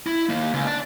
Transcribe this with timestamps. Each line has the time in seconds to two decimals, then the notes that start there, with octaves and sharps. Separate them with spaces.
0.07 E4
0.29 D#3 A#3
0.54 C#2
0.67 D5 A5